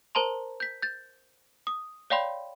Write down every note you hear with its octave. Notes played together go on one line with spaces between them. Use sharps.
A#4 C5 A5 A#5 C6
G6 B6
G6 A6
D#6
C#5 D5 F5 G5 B5 C6